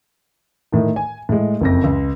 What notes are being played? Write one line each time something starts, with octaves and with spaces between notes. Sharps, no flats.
A2 D#3
G#5
A2 G#3
F#1 F2 A#6
C#2